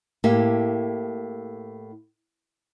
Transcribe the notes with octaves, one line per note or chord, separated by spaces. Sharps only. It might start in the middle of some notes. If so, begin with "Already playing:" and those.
A2 A#3 E4 G4